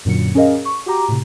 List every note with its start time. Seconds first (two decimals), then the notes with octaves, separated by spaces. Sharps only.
0.05 F#2 A#2 D3 F#3 C#7
0.35 C#4 G#4 A#4 D#5 F5
0.65 C#6
0.86 F#4 G4 A#5 D6
1.08 A2 C3